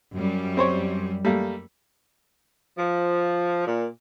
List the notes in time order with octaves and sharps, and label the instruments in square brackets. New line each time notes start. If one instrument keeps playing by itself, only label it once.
[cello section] F#2 G3
[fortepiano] C4 C5 C#5
G3 A3 A#3
[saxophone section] F3
A#2